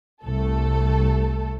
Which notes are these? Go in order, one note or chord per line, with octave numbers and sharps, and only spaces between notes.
C2 A3 A4